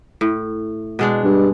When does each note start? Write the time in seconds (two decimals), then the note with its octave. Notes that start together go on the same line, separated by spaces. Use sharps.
0.21 A2
0.99 B2 G#3 D4
1.24 G2